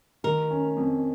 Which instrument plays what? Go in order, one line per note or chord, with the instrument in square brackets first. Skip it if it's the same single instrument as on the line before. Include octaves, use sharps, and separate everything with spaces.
[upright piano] D#3 [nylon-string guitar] A#4
[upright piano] C#4
F2